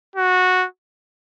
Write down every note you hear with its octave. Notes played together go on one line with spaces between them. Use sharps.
F#4